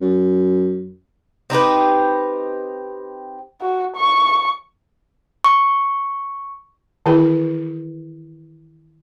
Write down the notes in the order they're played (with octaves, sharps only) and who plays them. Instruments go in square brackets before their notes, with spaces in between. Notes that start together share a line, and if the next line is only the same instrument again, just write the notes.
[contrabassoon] F#2
[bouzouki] C4 D#4 G4 B4
[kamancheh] F#4
C#6
[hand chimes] C#6
[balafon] D#3 E3 E4 G#4 B4 G5